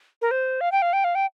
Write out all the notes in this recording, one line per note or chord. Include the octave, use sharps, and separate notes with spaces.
A#4
C5
F5
G5
F5
G5
F5
G5